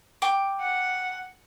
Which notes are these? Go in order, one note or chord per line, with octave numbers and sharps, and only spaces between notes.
G5 D6
F#5